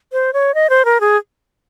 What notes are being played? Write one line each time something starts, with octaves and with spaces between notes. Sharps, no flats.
C5
C#5
D#5
C5
A#4
G#4